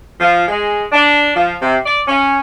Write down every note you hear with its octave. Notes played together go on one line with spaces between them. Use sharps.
F3
G#3
D4
F3
C3
D5
C#4